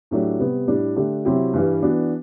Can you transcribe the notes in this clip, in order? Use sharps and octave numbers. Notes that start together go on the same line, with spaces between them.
A2 F#3 A3 D4 G4
C3 G3 B3
A2 G3 D4
D3 A3 D4 G4
C3 F#3 C4 E4 G4
G2 E3 G3
E3 B3 D4 F#4